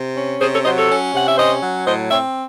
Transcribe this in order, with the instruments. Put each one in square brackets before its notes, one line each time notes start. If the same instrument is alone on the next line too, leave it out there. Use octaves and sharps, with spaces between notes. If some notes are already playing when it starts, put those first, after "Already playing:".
Already playing: [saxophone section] C3
C#4
C3 G#4 C5
A4 C#5
F#3 C5 D#5
A4 C#5
C#4
C3 F#5
E5
C#4 C5 D#5
F#3
A2 C5 D#5
C4 C#5 E5